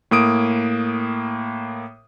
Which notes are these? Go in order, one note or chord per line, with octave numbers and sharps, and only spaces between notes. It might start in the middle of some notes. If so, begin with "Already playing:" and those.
A2 A#3 D#6 D7